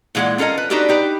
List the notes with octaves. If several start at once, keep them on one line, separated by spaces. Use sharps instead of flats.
A#2 E3 G#3 F#4 F#5
C#4 F4 A4 A#4 D#5
B4
D4 D#4 F#4 G4 A4 B4
D#4 G4 B4